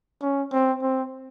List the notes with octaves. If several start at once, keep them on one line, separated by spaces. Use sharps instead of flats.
C#4
C4
C4